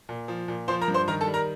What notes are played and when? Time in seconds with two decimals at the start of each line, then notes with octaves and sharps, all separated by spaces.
0.09 A#2
0.28 F3
0.48 A#2
0.68 F3 C5 C6
0.81 A#4 A#5
0.88 G2
0.94 C5 C6
1.08 D#3 A#4 A#5
1.21 A4 A5
1.27 G3
1.34 A#4 A#5